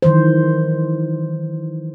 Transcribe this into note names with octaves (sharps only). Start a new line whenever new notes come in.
D#3 E3 F#3 C5